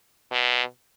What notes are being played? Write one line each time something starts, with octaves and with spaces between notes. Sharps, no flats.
B2